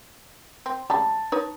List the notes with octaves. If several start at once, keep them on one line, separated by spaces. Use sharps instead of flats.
C4
C#3 G3 G#3 A5
D#4 B4 C#5